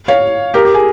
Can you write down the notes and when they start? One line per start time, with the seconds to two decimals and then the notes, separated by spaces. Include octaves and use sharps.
0.08 C#5 F5
0.54 G4 A#4
0.65 G4
0.75 G#4